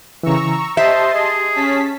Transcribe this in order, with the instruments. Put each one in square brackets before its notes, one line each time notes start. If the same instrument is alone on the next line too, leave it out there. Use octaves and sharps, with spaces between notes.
[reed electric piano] C#3 E3 [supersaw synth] A#5 C#6 E6
[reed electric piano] G4 [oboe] C5 [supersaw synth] D#5 A5 C6 [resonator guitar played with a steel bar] E5
[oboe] G#4
[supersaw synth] C#4 A5 B6